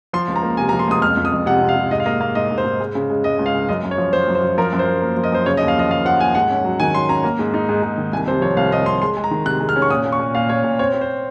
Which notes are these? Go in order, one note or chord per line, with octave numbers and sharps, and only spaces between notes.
F3 C6
C#2
A#5
A#3
C3 G#5
A#5
F3
C6
C#2 D#6
F2 F6
F2
D#6
F2
C3 F#5
C3
F5
C3
G#2 D#5
F5
A#3 D#5
A#3 F5
G#2 D#5
G#2
C5
G#2
G#3
C#3
G#3
G#3 D#5
C#2
F5
C#3
F#2 D#5
F#2
C#5
F3
F3 C5
F#2
C5
F3
F3 A#4
F#2
C5
F#2
A#3
F3
D#5
F#2 C5
C#3 C#5
D#5
D#2
F5
F3 D#5
D#2 F5
F3 F#5
D#2 G#5
G#2 F#5
C#4
F#3
D#3 G#5
F#3 C6
C#4 A#5
A#3
G#2
D#4
G#2
G#2
D#3
C2 G#5
C3 C5
F3 C#5
C2 F5
C3 D#5
C2 C6
G#3 C6
G#3
A#5
D#3
C3 F#6
G#3
F6
C#4
C#6
A#2 D#6
A#2
C#6
A#2
A#2 F5
A#2 C#5
A#2
C4 C#5
C4
C5